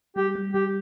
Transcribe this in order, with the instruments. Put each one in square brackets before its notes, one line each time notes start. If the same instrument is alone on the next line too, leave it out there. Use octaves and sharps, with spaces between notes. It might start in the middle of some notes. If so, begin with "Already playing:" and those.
[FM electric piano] G3 [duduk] G4
[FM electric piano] G3
[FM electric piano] G3 [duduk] G4